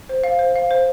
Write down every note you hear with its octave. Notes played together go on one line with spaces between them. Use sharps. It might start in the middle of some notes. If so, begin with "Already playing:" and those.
C5
F5
C5
F5
C5